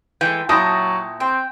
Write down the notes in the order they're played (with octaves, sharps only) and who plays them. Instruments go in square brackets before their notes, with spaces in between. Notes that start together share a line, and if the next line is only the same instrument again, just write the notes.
[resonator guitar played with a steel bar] E3 G#3 A3 [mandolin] G5
[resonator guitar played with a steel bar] A#2 E4 [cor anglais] F#3 [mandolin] G5 [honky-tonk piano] A5 D#6 A#6
[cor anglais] C4 [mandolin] G5